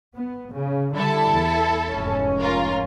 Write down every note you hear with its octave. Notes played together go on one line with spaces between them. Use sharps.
B3
C#3
D3 G3 E4 A4 A5
E2
F1 G#2 C#4
F4 A#4